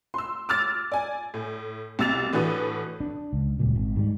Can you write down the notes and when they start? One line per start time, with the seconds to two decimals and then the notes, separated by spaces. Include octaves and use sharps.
0.14 C6 E6
0.49 D6 E6 F6 A6
0.92 D5 G#5
1.34 A2
1.99 C2 B2 E6 A6 F7
2.33 A2 E3 D4 F#4 B4 D#6
3.00 D4
3.33 C#2
3.59 D#1 C#2 A#2
3.76 G#1
3.96 G#2 G3